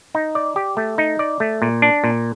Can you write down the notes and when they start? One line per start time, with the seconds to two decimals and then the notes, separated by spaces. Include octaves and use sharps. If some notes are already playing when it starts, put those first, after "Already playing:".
0.15 D#4
0.35 D5
0.56 G4
0.77 A3
0.98 D#4
1.19 D5
1.40 A3
1.62 A#2
1.82 D4
2.04 A#2